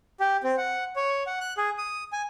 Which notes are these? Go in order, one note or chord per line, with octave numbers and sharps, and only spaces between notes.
G4
C4
F#5
C#5
F#5
F#6
G#4
D#6
G#5